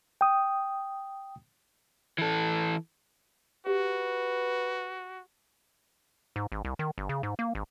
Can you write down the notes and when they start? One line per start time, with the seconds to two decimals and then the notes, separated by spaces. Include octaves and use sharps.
0.21 G5 D#6
2.18 E3 A4
3.67 F#4 G4 B4
6.36 G#2
6.52 G#1
6.65 C2
6.79 D#3
6.98 G1
7.09 C#3
7.23 G#2
7.39 A#3
7.55 G#1